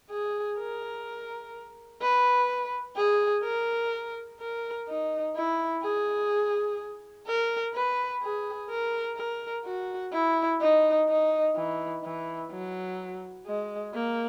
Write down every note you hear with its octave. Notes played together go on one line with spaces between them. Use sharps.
G#4
A#4
B4
G#4
A#4
A#4
D#4
E4
G#4
A#4
B4
G#4
A#4
A#4
F#4
E4
D#4
D#4
E3
E3
F#3
G#3
A#3